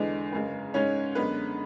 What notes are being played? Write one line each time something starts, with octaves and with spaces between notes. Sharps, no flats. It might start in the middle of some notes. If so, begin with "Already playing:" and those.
Already playing: E2 D3 G#3
F#2 C#3 G#3
G#2 G#3 C#4 C#5
F#2 D3 G#3 B3 B4